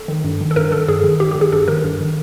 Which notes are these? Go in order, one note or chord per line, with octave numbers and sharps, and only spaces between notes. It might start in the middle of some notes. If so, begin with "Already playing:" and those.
Already playing: A4
D#3
G2
D#3
A4
G2 A#4
D#3 A4
G2 G#4
D#3
G2 G4
D#3 G4
G#4
G2 A4
D#3 A#4
G2
D#3